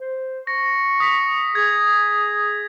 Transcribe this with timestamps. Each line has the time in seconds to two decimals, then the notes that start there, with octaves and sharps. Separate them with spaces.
0.01 C5
0.47 C#6 A#6
1.00 D#6 B6
1.55 G#4 G#6